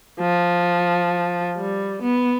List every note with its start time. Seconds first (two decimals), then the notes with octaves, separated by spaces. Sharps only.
0.21 F3
1.57 G3
2.03 B3